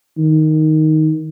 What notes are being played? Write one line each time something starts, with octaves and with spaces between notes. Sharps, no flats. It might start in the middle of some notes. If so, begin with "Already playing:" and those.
D#3